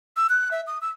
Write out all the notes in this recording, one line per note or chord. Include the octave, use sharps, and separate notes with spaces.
E6
F#6
E5
D#6
E6